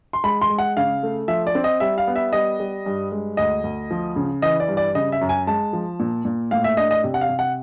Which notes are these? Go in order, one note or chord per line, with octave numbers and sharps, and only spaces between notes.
C6
G#3 B5
C6
G#3
F#5
C#3 F5
A3
F3 E5
D5
C4
D#5
G3 E5
F5
B3
E5
G3 D#5
G3
G2
G#3
D2 D#5
D2
F3
C#3
E3 D#5
D5
G2
D5
C#3 D#5
E5
F#2
G#5
G#3 A5
F3
A#2
A#2
A2 F5
E5
D4 D#5
D#5
C3
F#5
F5
C3
F#5